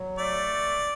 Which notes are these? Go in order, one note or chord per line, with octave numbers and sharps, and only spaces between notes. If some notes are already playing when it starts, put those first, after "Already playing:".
Already playing: F#3
A3 D5